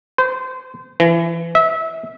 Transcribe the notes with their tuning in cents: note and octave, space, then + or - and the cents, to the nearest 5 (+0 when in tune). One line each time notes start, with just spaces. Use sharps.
C5 -30
E3 +30
E5 -25